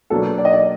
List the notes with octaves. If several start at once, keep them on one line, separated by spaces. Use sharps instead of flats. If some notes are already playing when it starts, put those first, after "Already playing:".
B2 F#3 A#3 D4 A4
D5
D#5
D5